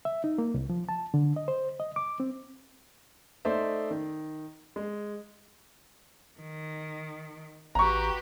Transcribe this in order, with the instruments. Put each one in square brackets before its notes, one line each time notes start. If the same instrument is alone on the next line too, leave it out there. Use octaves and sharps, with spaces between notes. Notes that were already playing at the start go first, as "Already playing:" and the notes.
[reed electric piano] E5
D#4
A#3
C2
F3
A5
D3
D#5
C5
D#5
D6
C4
[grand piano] A3 D#4 C5 D5 E5
D#3
G#3
[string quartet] D#3
[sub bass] A1 [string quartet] F#4 G4 B4 [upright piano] A#5 C#6